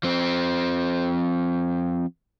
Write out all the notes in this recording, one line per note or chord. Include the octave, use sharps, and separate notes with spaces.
F3 C4